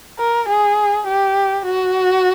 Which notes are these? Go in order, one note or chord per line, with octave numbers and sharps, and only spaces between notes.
A#4
G#4
G4
F#4